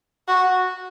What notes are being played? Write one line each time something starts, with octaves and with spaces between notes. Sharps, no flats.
F#4